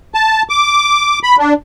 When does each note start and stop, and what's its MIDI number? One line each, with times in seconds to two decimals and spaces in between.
0.14 0.42 81
0.49 1.19 86
1.23 1.36 83
1.39 1.53 62